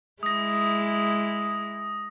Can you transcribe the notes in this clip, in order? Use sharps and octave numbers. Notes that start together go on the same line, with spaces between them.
G#3 E4 D#6 A#6